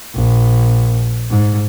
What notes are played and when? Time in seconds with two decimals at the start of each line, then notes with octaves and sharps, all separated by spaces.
0.14 A#1
1.30 G#2